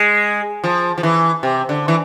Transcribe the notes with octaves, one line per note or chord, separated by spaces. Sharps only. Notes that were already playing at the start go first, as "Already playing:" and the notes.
Already playing: G#3
F3
F3
E3
C3
D3
E3